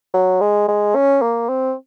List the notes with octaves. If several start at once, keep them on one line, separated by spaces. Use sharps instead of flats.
F#3
G#3
G#3
C#4
A#3
C4